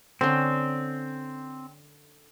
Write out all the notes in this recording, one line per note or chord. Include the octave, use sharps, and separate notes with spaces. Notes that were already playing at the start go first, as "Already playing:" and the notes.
D3 C4 C#4